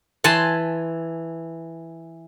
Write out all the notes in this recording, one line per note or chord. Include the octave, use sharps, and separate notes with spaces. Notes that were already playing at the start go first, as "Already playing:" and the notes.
E3 G#5 A5 C6